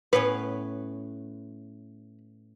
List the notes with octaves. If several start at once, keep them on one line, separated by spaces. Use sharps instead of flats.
A2 B3 C#4 B4